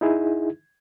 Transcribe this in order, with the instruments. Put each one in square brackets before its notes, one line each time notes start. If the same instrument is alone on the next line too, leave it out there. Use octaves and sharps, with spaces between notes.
[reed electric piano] D#4 E4 G#4